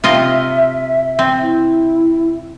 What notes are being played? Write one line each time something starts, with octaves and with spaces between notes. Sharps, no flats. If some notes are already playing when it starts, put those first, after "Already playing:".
C3 F4 D#5 E5
C4
E4